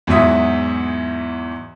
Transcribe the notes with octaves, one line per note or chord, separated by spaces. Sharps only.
E2 G#2 F#3 E4 E5 D#6